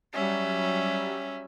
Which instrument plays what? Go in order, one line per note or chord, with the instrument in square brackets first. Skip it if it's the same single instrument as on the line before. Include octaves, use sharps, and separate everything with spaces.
[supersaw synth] F#3 G3 [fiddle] C#4 [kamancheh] E5